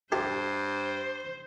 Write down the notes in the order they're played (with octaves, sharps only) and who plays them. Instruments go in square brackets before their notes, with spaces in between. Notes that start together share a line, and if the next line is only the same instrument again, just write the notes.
[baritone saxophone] G2 [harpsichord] E4 G4 A4 [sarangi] C5